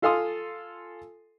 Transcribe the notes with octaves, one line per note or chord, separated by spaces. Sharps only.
F4 A4 F5 G#5 C6 D#6